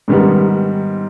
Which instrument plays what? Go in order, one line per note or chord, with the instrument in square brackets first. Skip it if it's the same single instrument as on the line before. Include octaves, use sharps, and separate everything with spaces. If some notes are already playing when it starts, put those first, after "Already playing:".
[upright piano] G#2 D#3 G3 B3